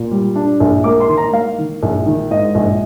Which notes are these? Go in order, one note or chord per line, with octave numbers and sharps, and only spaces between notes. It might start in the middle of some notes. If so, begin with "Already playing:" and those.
Already playing: A#2
G3
D4
A#1
A#3 D6
C6
D#3
A#5
A#3 F5
D#3
A#1
D#3
G#2 D#5
A#1